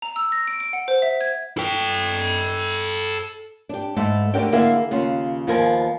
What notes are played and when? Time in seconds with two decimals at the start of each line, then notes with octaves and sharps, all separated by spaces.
0.02 A#5
0.16 E6
0.32 A#6
0.47 D7
0.60 D7
0.73 F#5
0.88 C5
1.02 E5
1.21 G#6
1.58 A4 G5
3.69 D4 G4
3.96 G#2 A3 E4 A4
4.34 D2 D3 D4 G4 A#4 G5
4.52 D3 A#3 E4 G#4 A#4 F5
4.91 D#2 C#3 F4
5.47 D#2 F3 B3 A#4 G#5